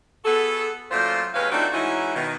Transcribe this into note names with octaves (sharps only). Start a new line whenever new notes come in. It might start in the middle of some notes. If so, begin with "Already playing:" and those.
B3 F#4 G#4 A4
F#2 A#2 A3 F4 C5
D#2 G#3 C#4 B4 C#5 F5
A3 C4 D4 D#4 F4 F#4
E3 G#3 C#4 D#4 E4 F#4
B2 D#3